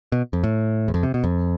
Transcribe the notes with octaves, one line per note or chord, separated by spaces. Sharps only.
B2
F2
A2
E2
F2
C3
B2
F2